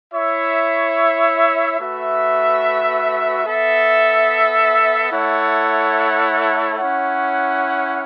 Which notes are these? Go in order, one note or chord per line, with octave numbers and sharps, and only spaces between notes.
E4 C#5 E5
A3 F#4 B4 E5
B3 A4 E5
A3 E4 A4 C#5 F#5
C#4 E4 C#5 F#5